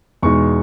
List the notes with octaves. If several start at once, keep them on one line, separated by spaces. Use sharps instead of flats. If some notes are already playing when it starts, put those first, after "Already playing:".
E2 B2 G#3 D#4 C#6